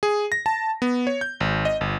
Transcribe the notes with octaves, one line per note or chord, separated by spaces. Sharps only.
G#4
A#6
A5
B3
C#5
G6
G#1
D#5
G1